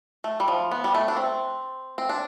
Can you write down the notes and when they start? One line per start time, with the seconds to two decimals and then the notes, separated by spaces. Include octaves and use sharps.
0.24 A3
0.40 G3
0.48 F3
0.71 B3
0.84 G3
0.95 A3
1.08 D4
1.17 C4
1.98 C4
2.09 D4